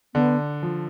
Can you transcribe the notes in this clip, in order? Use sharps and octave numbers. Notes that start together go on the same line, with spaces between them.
D3 B3
F3